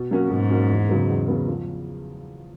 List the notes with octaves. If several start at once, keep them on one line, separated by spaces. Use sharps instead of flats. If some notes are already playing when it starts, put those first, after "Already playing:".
Already playing: B2
F#3 A#3 C#4 F#4
G#2 B2
F#3 A#3 C#4 F#4
E2
C#3 F#3 B3
E2
C#3 F#3 B3
F3